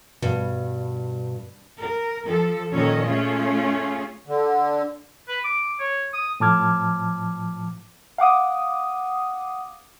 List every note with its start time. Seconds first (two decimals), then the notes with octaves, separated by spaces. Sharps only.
0.22 G2 B2
1.80 A#4
2.26 F3 A4
2.72 A#2 D#3 C#4 A4 C#5 D#5
3.03 A3 C#4 F4 G#4
4.27 D3
5.28 B4
5.44 D6
5.80 C#5
6.13 D#6
6.40 A2 F3 A5 D6 F6 G#6
8.18 F5 F#5 D6 D#6